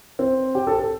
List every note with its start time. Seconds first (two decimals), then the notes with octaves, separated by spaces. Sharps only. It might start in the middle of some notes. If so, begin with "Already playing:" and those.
0.19 C4
0.55 G4
0.67 A4
0.79 A4